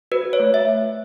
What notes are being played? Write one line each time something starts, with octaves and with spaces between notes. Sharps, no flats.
F#4 B4
C#5
A3
E5